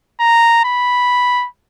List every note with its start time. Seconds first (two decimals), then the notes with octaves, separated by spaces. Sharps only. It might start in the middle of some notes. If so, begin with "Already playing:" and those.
0.20 A#5
0.65 B5